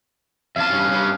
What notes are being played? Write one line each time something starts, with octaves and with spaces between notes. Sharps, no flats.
F2 F5 A5
G2 C#4
G2 C#4